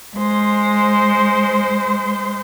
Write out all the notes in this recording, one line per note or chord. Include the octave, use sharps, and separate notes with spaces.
G#3 C5